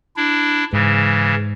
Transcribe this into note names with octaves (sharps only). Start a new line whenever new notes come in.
D4 E4
G#2 C#3 E3